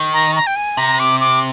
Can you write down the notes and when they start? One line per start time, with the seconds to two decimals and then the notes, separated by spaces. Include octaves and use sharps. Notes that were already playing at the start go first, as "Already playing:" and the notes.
Already playing: D#3
0.13 A#5
0.36 A#5
0.47 G5
0.56 G#5
0.77 C3 A#5
0.99 D6
1.20 D6